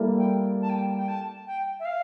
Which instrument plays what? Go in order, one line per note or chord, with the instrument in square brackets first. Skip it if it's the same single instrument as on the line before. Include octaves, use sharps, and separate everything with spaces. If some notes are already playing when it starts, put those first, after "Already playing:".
Already playing: [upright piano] G3 A#3 E4 A4
[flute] G5
A5
G5
G5
A5
G5
E5
F5